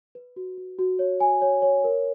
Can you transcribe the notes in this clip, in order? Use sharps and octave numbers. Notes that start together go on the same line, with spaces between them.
B4
F#4
F#4
F#4
C#5
G#5
C#5
C#5
A#4